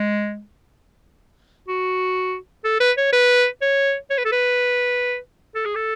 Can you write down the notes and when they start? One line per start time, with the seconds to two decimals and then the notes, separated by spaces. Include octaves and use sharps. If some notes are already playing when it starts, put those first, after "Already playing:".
Already playing: G#3
1.68 F#4
2.64 A4
2.80 B4
2.97 C#5
3.12 B4
3.62 C#5
4.10 C#5
4.17 B4
4.25 A4
4.32 B4
5.55 A4
5.65 G#4
5.75 A4